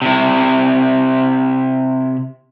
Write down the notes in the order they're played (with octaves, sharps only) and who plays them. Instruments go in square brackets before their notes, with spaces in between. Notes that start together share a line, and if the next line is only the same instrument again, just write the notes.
[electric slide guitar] C3 E4